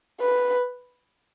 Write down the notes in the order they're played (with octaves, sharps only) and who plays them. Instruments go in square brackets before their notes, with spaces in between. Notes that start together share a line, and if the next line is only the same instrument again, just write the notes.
[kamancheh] B4